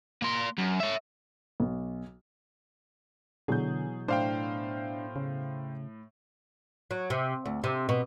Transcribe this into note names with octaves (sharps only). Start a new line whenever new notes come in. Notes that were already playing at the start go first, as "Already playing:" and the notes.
A#3 C6
F#2
C#5 E5
B1
B2 D3 E3 F#3 G#4 G6
A2 D4 C5 F5 G5
C#3
F#3
C3
D2
C3
B2